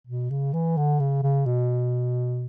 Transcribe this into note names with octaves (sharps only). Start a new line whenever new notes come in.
B2
C#3
E3
D3
C#3
C#3
B2